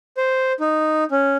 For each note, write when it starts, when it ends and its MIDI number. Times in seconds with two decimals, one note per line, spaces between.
0.17 0.52 72
0.60 1.04 63
1.11 1.37 61